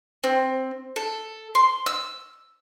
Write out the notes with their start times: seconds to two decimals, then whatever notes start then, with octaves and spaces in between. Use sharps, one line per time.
0.24 C4
0.96 A4
1.55 C6
1.86 E6